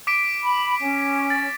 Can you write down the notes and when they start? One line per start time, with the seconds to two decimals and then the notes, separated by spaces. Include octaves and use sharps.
0.07 D6 B6 D7
0.42 B5
0.80 C#4
1.30 A6